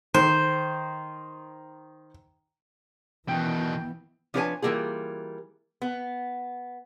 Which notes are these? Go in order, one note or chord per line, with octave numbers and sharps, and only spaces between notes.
D#3 C5
B2 D#3 E3 B3 G5
F3 D4 G4 B4 C#5 G#5
E3 G3 A#3 F4 G#4
B3